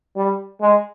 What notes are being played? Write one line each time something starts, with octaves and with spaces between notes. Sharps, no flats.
G3
G#3